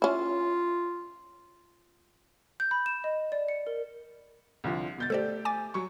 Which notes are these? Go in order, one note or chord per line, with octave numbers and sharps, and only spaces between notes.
C#4 E4 F4
G6
B5
E7
D#5
D5
C#7
A#4
C2 D3 F3
B2 G6 A6
A3 G4 A4 C5 D5
G#5 D6 A6
F#3 C#6